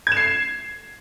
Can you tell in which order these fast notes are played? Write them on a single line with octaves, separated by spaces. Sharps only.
G#6 E7 C7